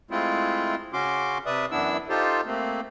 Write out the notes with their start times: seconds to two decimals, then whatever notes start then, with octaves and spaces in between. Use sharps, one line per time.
0.11 G#3 A3 C4 E4 F4
0.93 C#3 C#4 F#4 C6 D6
1.46 C3 B4 D5 E5 D#6
1.71 F#2 E3 B3 D4 E4 E6
2.09 D#4 F4 G4 A4 C5
2.46 A3 A#3 C4